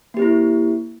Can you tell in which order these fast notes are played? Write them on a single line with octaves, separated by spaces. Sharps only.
A#3 G4 C4 E4